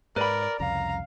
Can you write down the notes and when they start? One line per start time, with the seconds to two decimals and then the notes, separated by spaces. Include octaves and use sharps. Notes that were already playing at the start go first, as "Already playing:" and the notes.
0.16 G#2 A#4 B4 D5 B5
0.60 C2 F2 C#3 F5 A#5